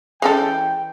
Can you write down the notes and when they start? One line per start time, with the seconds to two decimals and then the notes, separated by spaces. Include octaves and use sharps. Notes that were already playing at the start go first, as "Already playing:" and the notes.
0.22 E3 G#3 C#4 A4 G5